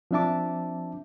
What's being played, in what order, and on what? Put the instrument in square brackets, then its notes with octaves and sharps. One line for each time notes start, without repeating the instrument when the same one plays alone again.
[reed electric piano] F3 C4 D4 E5 A5 D6